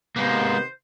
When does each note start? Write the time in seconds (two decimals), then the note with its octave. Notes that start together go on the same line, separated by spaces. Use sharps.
0.16 C3 D#3 G#3 A#3 B3 C5